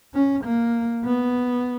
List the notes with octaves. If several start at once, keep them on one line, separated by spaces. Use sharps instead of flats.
C#4
A#3
B3